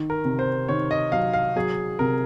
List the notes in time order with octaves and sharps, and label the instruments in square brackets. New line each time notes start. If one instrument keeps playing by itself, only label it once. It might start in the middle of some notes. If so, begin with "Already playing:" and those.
Already playing: [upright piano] D#3
[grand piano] A#4
[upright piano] C3
[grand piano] C5
[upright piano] D#3 [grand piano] C#5
[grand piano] D#5
[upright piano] F#3 [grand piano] F5
[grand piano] F5
[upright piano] F#3 [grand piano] G#4
[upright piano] C3 [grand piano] A#4